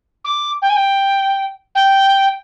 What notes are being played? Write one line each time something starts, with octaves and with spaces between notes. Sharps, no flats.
D6
G5
G#5
G5
G5